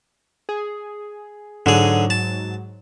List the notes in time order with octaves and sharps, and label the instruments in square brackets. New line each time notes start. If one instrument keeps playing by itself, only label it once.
[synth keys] G#4
[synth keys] G#2 F#3 [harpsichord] D3 G#4
[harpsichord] A5